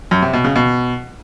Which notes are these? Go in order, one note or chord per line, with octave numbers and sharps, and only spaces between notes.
F#2
C3
B2
C#3
B2